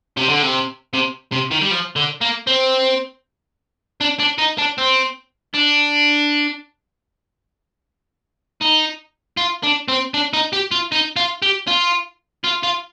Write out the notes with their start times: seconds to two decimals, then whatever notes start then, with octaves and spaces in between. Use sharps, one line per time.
0.17 C3
0.29 D3
0.43 C3
0.94 C3
1.32 C3
1.51 D#3
1.62 G3
1.71 F3
1.96 D3
2.21 A#3
2.47 C4
4.01 D4
4.19 D4
4.38 D#4
4.58 D4
4.78 C4
5.54 D4
8.61 D#4
9.37 F4
9.63 D4
9.88 C4
10.14 D4
10.33 D#4
10.53 G4
10.71 F4
10.92 D#4
11.16 F4
11.42 G4
11.67 F4
12.44 F4
12.63 F4